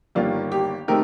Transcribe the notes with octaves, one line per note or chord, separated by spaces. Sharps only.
G1 G2 D#3 A#3 D4 F4
G4
D#3 A3 C4 D#4 G4 A#4